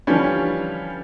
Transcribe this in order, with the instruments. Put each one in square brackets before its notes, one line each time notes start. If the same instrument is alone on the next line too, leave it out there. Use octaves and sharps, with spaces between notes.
[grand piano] D3 E3 F3 G3 C#4